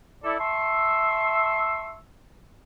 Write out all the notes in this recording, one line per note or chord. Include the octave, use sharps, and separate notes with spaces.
E4 A4 D5
E5 A5 C6 C#6 E6